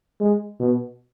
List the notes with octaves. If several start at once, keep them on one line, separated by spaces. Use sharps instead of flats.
G#3
B2